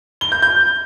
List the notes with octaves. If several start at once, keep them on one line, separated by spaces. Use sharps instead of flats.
G7
G6
G6